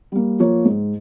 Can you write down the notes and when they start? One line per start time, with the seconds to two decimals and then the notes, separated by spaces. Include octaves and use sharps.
0.12 G3 A#3
0.39 F3 A#3 C#5
0.65 G#2